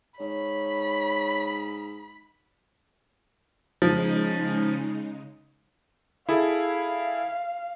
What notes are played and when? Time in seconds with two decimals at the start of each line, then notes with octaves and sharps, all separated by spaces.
0.20 G#2 C#5 B5
3.82 C#3 F3 G#3 D#4
6.29 E4 G#4 A4 F5